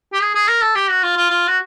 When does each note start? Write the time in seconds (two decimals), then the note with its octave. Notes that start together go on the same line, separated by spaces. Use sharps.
0.13 G4
0.21 G#4
0.35 G#4
0.48 A#4
0.62 A4
0.75 G4
0.89 F#4
1.03 F4
1.17 F4
1.30 F4
1.48 F#4